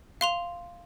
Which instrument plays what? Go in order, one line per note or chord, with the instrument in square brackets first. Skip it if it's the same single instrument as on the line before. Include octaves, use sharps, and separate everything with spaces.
[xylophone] F5 C6 F7